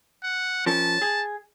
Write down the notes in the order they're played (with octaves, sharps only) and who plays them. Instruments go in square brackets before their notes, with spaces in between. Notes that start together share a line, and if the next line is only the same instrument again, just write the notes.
[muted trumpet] F#5
[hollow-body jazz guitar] F3 C#4 A#4 [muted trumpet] A5
[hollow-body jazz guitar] G#4